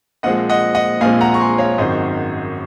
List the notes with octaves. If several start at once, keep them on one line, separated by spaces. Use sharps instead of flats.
A#1 A#2 F3 G#3 C4 D#5 F#5
D#5 F#5
D#5 F#5
A#1 A#2 F3 G#3 C4 F5 G#5
F#5 A#5
C#6
G#5 C6
C#5 F5
G#1 F#2 D#3 F#3 C5 D#5